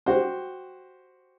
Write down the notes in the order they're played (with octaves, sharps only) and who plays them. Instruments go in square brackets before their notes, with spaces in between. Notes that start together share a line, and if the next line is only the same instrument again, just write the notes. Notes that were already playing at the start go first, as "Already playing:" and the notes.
[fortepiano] F#4 G4 C5